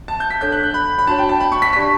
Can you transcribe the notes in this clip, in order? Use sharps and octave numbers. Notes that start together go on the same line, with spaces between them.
A5
G6
B6
D4 A4 C#5 G6
F#6
F#6
B5
B5
D4 F#4 C#5 A5
G5
A5
B5
C#6
B6
D4 G4 D5 A5 C#6 B6